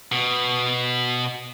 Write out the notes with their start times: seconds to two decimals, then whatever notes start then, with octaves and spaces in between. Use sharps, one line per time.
0.12 B2